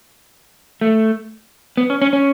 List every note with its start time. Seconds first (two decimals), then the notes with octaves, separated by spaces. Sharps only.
0.81 A3
1.77 B3
1.90 C#4
2.02 C#4
2.13 C#4